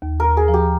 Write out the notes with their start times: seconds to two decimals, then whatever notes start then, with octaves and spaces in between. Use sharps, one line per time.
0.02 D#2
0.20 A#4
0.26 D#2
0.37 G#4
0.48 F3
0.54 G4